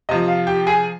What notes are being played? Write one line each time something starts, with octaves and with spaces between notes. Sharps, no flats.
C3 F3 D#5
F5
G4 G5
G#4 G#5